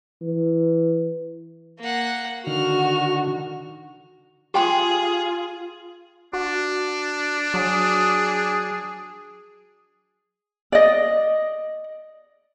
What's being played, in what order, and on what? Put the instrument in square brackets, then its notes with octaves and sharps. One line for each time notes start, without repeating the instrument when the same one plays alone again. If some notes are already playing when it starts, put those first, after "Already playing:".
[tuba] E3
[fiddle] A#3 F#5
[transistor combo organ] D3 D#3 [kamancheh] F#4 [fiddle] F6
[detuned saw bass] F4 [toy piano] G4 G5 C6 [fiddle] G#4
[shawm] D4 [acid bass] F#4
[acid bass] F#3 [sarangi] G#4
[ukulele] D5 D#5